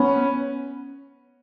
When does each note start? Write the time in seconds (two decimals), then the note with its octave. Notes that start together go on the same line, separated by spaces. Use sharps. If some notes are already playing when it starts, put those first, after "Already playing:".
Already playing: B3 C#4